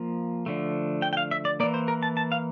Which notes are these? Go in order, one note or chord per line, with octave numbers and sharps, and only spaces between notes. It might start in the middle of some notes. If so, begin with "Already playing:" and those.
Already playing: F3 A#3
D3 F3 A3
G5
G5
F5
E5
D5
E3 A#3 D5
C5
A#4
A5
A5
F5